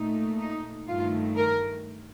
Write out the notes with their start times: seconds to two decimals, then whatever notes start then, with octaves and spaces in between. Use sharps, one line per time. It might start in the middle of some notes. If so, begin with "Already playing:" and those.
Already playing: A#2 A3 D#4
0.39 D#4
0.87 G2 D#3 A3 F4
1.36 A#4